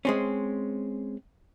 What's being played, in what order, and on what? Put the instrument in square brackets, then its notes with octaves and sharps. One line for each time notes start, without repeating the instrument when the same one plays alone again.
[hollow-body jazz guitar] G#3 C4 C#4